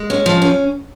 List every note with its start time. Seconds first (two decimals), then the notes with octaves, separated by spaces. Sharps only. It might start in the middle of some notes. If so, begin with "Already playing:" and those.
Already playing: G#3
0.10 C#4
0.26 F3
0.42 C#4